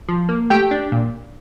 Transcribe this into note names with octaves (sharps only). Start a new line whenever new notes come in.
F3
A#3
A3 G4 G5
D4
A#2